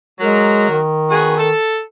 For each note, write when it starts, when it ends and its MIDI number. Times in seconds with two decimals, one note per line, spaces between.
0.20 0.79 54
0.20 0.67 56
0.20 0.79 70
0.70 1.51 51
1.10 1.34 59
1.10 1.34 66
1.10 1.34 68
1.38 1.80 69